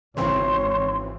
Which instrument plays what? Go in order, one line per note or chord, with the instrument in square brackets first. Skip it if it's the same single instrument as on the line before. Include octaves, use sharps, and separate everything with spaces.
[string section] G#1 [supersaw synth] C#3 E3 C4 [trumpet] C#5 [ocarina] C6